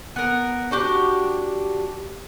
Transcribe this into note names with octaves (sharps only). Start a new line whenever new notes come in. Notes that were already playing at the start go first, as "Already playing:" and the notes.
B3 A#4
D4 F#4 G4